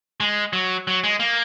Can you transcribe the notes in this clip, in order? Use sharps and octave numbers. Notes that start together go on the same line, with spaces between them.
G#3
F#3
F#3
G#3
A#3